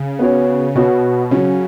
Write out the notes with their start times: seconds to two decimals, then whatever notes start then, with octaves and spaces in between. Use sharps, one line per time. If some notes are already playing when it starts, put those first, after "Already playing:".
Already playing: C#3
0.19 B3 F#4 C#5
0.75 B2 B3 F#4 C#5
1.31 C#3 F#3 C#4 F#4